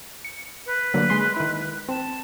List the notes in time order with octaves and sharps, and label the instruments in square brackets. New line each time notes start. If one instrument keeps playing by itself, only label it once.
[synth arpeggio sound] C#7
[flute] B4
[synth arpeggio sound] D3 F#3 A#3
G#3 C6
D#3 E4
[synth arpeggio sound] C4 [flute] A5